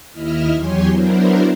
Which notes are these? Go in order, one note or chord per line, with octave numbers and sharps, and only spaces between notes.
D#2 E4 D#5 E5 F6
E2 F#3 G4 C#5 G#5 C6
F#3 B3 D4 E4 A#4 C5